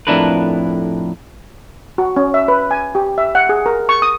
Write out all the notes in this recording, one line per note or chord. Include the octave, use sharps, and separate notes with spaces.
F2 A2 D4 E4 A#4 B4
F#4
C#4
E5
B4
G#5
G4
E5
F#5
G#4
A#4
C#6
D#6